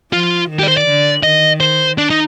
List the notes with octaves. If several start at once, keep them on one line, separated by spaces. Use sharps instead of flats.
F3 F4
D#3
G4
D5
C5
D5
D3
D#3 D#5
C5
D4
D#4